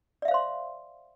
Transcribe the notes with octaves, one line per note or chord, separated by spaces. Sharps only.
C5 D5 E5 F5 C6